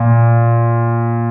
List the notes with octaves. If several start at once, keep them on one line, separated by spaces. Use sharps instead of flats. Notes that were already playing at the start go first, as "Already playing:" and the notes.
Already playing: A#2